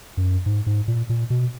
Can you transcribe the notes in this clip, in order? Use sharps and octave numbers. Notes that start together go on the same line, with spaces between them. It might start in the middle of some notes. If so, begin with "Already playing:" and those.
F#2
G#2
G#2
A#2
A#2
B2